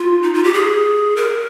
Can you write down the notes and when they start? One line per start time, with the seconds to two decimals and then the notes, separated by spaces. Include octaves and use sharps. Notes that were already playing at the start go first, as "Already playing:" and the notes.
Already playing: F4
0.23 D#4
0.34 F4
0.44 G4
0.54 G#4
1.16 A#4